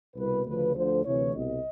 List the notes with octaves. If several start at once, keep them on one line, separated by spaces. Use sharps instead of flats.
C2 B2 B4
D2 C#3 F3 B4
D2 D3 F3 C5
D2 C3 E3 C#5
C2 B2 D#5